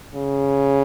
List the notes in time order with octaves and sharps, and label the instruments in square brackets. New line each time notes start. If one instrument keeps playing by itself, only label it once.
[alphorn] C#3